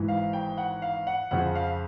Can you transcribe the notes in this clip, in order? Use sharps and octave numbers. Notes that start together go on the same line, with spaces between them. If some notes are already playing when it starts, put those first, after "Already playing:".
Already playing: G#1 G#2 E3
F5
G5
F#5
F5
F#5
F2 C#3 F3 F#5
F5